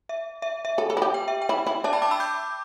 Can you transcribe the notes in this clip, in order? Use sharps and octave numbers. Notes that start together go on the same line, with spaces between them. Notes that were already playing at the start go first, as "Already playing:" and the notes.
E5
E5
E5
A4
A4
E4
G4
G5
E5
G5
E4
E4
D4 E5 A5
G5 B5
A5 D6
B5 E6
D6 G6